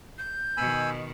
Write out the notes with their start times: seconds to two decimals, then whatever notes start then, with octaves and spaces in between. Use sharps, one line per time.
0.18 G6
0.57 B2 D#3 G#5 B5 E6